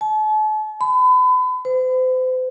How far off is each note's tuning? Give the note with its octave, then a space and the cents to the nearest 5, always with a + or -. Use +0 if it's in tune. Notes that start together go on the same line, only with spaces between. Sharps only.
A5 -40
B5 +35
C5 -35